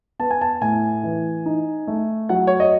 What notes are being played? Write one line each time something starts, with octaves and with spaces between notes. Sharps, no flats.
B3 A5
G#5
A5
A2 G#5
E3
D#4
A3
F#3 F#5
C#5
D#5